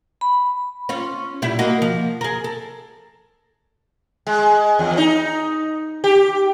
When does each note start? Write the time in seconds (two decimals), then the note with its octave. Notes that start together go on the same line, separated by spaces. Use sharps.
0.21 B5
0.89 C#4 F4
1.42 A#2 G3 E4
1.59 A#3 F#4 D#5
1.82 F3
2.21 G#4 A#4
2.44 A4
4.27 G#3
4.79 E2
4.98 D#4
6.04 G4